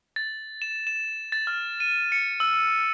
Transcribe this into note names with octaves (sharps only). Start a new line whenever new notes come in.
A6
E7
E7
A6
F6
D#7
C#7
E6